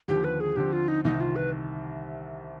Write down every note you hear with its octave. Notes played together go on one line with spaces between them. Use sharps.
D#2 D3 F3 G4
B4
G#4
D3 F3 C4 G4
F4
D#4
C2 C3 D#3 D#4
F4
B4